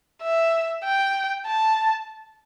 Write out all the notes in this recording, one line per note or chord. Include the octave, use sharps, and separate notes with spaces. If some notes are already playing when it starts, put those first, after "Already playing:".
E5
G5
A5